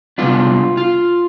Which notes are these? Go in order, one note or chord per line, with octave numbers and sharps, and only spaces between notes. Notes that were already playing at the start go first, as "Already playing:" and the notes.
C3 G3 B3 D4 F4
F4